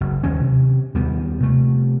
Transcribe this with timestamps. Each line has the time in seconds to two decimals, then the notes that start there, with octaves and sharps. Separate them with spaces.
0.01 F#1
0.23 D#2 D#3 F#3 C#4
0.40 C3
0.94 D#2 G3 B3
1.40 C3 A3